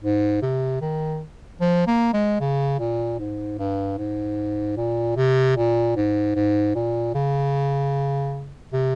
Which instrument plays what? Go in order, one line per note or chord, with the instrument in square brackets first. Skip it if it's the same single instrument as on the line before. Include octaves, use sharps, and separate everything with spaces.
[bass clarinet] G#2
C3
D#3
F3
A#3
G#3
C#3
A#2
G#2
G2
G#2
A#2
C3
A#2
G#2
G#2
A#2
C#3
C3